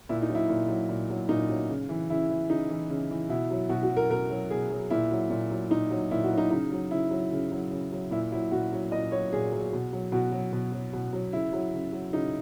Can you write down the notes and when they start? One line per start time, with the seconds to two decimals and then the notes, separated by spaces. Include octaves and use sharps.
0.09 A#2 E4
0.22 D#4
0.29 F#3
0.35 E4
0.49 A#2
0.68 F#3
0.89 A#2
1.10 F#3
1.29 A#2 D#4
1.49 F#3
1.69 C#3
1.89 E3
2.10 C#3 E4
2.30 E3
2.49 C#3 D#4
2.70 E3
2.89 C#3
3.10 E3
3.29 B2 E4
3.51 F#3
3.69 B2 F#4
3.83 F#4
3.90 F#3
3.97 A#4
4.10 B2 A#4
4.30 F#3
4.50 B2 G#4
4.71 F#3
4.90 A#2 E4
5.11 F#3
5.30 A#2
5.51 F#3
5.70 A#2 D#4
5.90 F#3
6.11 A#2 E4
6.24 F#4
6.31 F#3
6.38 D#4
6.50 C#3 D#4
6.72 F#3
6.91 C#3 E4
7.11 F#3
7.32 C#3
7.51 F#3
7.71 C#3
7.92 F#3
8.11 A#2 E4
8.32 F#3 E4
8.51 A#2 F#4
8.72 F#3
8.92 A#2 D#5
9.12 F#3 C#5
9.33 A#2 G#4
9.52 F#3
9.73 B2
9.93 F#3
10.12 B2 F#4
10.32 F#3
10.53 B2
10.72 F#3
10.93 B2
11.13 F#3
11.33 C#3 E4
11.53 F#3
11.73 C#3
11.93 F#3
12.13 C#3 D#4